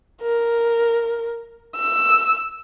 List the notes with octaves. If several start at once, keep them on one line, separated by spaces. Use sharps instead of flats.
A#4
E6